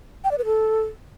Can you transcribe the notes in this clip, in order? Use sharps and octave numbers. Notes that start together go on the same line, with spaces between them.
G5
D5
B4
A4